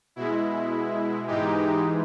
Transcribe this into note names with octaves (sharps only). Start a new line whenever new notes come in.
B2 G#3 E4
G#2 E3 G#3 D#4 G4